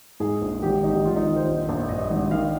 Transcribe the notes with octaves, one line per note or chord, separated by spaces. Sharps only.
G#2 G#4
A#1
G#1 G4
G#1 D#4
G4
G#1 F4
D#4
D#3
C5
A#1
A#1
G2 D#5
G#1
D#3 F5